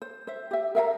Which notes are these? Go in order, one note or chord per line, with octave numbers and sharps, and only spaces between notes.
C5
C5 E5
G4 E5
A#4 E5 F5 A#5